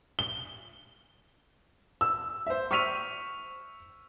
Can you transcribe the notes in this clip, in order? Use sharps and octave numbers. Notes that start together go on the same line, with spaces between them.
G7
E6
C5 E5
C#6 E6 F6 B6 D#7 F7